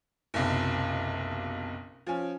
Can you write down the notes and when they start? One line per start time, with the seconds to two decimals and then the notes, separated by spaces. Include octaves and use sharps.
0.34 F#1 B1 C3
2.07 F3 C#4